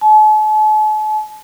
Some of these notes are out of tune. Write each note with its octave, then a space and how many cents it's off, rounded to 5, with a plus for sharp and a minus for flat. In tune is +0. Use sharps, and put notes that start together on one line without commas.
A5 -45